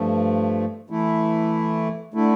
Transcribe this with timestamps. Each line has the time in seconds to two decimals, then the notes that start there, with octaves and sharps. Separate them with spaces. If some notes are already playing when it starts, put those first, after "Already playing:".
Already playing: G2 F3 A3
0.90 E3 A3 E4
2.14 D3 A3 E4